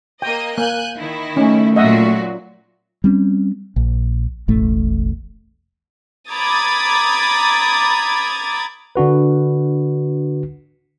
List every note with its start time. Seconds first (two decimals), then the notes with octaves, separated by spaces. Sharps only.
0.22 A#3 D#5 G5
0.58 A#3 G#5 F#6 G6
0.98 D#3 E4
1.36 A3 C#4 D#4
1.76 A#2 F#3 F#4 D#5 E5 F#5
3.04 G3 C4 C#4
3.76 A#1
4.48 E1 A1 A2 A3
6.30 A#5 B5 D6 D#6 G#6 A6
8.96 D3 D4 F#4 B4